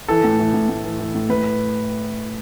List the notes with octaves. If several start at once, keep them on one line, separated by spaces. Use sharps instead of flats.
E3 A4
A2
E3
A2
A2
E3
E3
A2
A2 B4